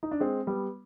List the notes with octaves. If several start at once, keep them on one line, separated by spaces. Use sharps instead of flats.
D#4
D4
G#3 C4
G3 B3